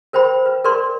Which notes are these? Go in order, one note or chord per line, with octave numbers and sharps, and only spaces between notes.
A#4 C5 G5 B5
B4
A#4 B4 D5 C6